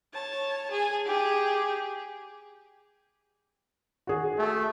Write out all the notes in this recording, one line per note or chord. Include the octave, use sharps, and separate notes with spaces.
C#5 A5
G#4 G#5
G4 G#4
F#4 G#4
A3